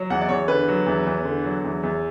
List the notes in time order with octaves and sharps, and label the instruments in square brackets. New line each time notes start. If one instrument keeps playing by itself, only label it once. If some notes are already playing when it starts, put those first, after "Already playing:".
Already playing: [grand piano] F#3
E2 F#5
D5
E2 C#5
D3 B4
F#3
E2
E2
D3
F#3
E2
E2